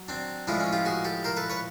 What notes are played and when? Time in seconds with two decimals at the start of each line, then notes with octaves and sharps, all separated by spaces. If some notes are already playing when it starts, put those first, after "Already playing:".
Already playing: F#3
0.08 C4 D4
0.47 A2 F3 G#3 D4 E4
0.60 C#4
0.72 F4 G4
0.85 F#4 G#4
1.05 G4 A4
1.24 A#4 C5
1.37 A4 B4
1.50 B4 C#5